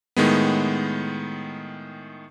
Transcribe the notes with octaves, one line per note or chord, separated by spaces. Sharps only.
A2 D#3 G#3 B3